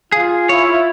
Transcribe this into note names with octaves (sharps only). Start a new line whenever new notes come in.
F4 G#4 F5
E4 C#5